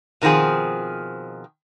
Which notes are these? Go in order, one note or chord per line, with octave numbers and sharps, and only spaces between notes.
B2 D#3 F3 C4 G#4